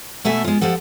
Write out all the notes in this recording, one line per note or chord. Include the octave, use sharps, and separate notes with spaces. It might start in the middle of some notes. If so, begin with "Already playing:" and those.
B2 A3 A4 E5 G#5
G#3 F4
F3 G4 A4 F#5